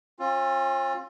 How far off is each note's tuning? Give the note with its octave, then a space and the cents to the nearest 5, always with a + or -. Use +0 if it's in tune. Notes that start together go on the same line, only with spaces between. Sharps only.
C#4 -45 F4 +20